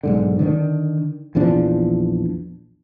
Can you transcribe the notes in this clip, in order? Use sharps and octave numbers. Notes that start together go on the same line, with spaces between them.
B1 G#2 D3
D3 D#3 B3 D4
A#1 E2 F3 D4